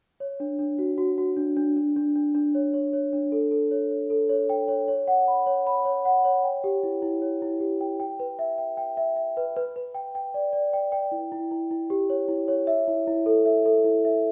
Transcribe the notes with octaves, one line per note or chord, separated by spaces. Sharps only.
C#5
D4
D4
F#4
F#4
F#4
D4
D4
D4
D4
D4
D4
C#5
C#5
C#5
D4
A4
A4
C#5
C#5
A4
C#5
G5
C#5
C#5
F#5
B5
C#5
B5
C#5
F#5
C#5
G5
G4
E4
E4
C#5
E4
G4
G5
G5
B4
E5
G5
G5
E5
E5
B4
B4
B4
G5
G5
D5
D5
G5
G5
E4
E4
E4
E4
G4
C#5
E4
C#5
E5
E4
E4
A4
E5
A4
E4
E5